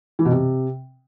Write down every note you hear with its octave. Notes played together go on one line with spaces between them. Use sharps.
E3
B2
C3